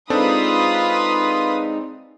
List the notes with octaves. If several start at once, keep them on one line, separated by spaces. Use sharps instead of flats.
G#3 C4 D4 D#4 F4 A4 B4 D#6